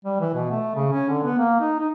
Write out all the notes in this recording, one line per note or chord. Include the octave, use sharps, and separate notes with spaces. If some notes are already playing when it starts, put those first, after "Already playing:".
G3
E3
B2
A3
C#3
C#4
D3
B3
A#3
D#4
D#4